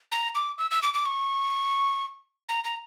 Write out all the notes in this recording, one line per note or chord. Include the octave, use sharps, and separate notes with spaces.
A#5
D6
E6
E6
D6
D6
C#6
A#5
A#5